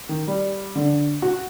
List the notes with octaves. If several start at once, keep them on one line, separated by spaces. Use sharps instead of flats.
D#3
G3
D3
F#4